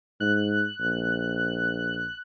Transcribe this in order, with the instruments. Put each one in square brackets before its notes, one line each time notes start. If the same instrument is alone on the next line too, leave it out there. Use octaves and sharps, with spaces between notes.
[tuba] G#2 [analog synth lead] F#6
[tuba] A#1